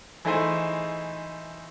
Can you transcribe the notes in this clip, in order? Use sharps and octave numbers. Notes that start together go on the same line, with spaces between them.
E3 A3 D#4 G#4 C5